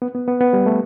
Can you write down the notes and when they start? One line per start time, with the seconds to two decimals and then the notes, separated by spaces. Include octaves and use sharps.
0.02 B3
0.15 B3
0.28 B3
0.41 B3
0.53 G3
0.66 A3